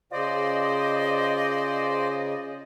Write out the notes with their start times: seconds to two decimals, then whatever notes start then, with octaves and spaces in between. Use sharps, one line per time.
0.12 C#3 F4 G#4 C5 D5 D#5